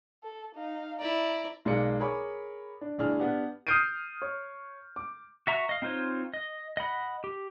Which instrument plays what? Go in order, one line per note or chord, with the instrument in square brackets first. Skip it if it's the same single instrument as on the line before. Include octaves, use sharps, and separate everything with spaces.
[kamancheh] A4
D#4 F5
[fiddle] E4 D5 [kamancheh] A#5
[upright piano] B1 G#3 A#3 D5 C#7
G#4 A#4 C#5 B5 C#6 D6
D4
G1 A2 D4 G#4 F6
B3 D4 G4
D#6 F6 G6 C7 D7 D#7
C#5
D6
[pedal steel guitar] F#4 E5 A#5 C#6
D#5 F5
C4 D#4 F4 C5 C#5
D#5
D#5 F#5 B5
G4